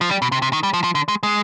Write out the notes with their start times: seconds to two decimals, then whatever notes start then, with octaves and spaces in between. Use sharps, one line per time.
0.01 F3
0.11 G3
0.22 B2
0.32 C3
0.42 C3
0.53 D#3
0.63 G3
0.74 F3
0.84 F3
0.95 D3
1.08 G#3
1.23 G#3